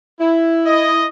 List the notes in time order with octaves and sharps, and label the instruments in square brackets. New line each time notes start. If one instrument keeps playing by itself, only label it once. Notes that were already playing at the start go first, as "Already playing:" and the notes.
[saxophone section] E4
[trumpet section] D#5